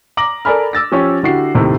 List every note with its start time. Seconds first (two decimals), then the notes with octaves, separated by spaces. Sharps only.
0.17 A#5 D6 A#6 F#7
0.45 A4 A#4 D5 G#5 B5 F6
0.73 D6 E6 A6 A#6
0.92 F3 C#4 G4 C#5
1.23 D3 E4 F#4 G4 C7
1.55 D#2 A2 C3 D#3 A3